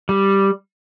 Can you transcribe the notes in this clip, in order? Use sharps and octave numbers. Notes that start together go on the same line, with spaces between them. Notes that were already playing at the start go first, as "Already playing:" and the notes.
G3